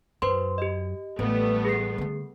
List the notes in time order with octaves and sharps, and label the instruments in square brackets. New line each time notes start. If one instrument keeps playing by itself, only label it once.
[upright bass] F#2 [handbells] B4 C5 C6
[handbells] G4 D#5
[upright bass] A1 [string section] G3 A3 B3
[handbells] G#4 C7
[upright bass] D3 A3